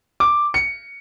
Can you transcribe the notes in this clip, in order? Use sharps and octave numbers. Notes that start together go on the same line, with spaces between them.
D6
C#7